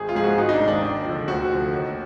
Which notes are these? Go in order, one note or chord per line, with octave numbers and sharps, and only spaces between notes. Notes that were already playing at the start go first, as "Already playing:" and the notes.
Already playing: G#1 G#4
F4
G#2 F3 G#4
F#4
G#1 D#4
D#4
D4
G#2
D#3 D4
D#2
D3 F3
D2 F#4
D3 F3
D#2